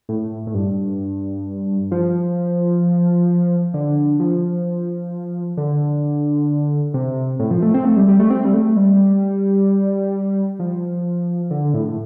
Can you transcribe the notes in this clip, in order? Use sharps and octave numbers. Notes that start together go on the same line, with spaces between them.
A2
A2
G2
F3
D3
F3
D3
C3
A2
F3
A3
C4
A3
G3
G3
A3
C4
G3
A3
G3
F3
D3
A2
A2